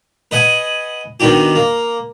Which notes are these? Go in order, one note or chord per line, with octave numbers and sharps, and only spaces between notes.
B4 D#5 F#5 G#5
D#3 B3 D4 F#4 G4
A#3